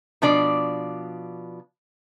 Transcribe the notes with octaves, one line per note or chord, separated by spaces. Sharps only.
B2 F3 D4 D5